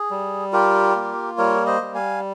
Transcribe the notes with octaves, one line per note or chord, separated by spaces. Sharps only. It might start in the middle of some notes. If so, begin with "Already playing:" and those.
Already playing: G#4
G3
F4 G4 A#4
A#3
G3 A#4 C#5
C5 D#5
G3
F5 G#5